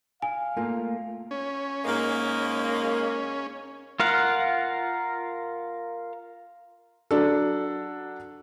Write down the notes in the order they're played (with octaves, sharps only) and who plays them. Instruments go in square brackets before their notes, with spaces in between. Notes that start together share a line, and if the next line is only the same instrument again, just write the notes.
[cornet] F5 [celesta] G#5
[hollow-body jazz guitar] A3 A#3 F4
[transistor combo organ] C#4
[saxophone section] G#2 G#3 A#3
[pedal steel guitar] F4 A#4 F5 F#5
[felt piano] F#3 D4 A4